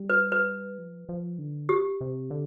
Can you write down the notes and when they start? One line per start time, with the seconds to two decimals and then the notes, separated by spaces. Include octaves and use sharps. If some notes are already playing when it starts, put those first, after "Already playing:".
Already playing: G3
0.10 B4
0.32 B4
0.78 F3
1.09 F3
1.39 D3
1.69 G4
2.01 C3
2.30 D3